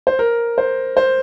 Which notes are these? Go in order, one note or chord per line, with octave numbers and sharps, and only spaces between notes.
C5
A#4
C5
C5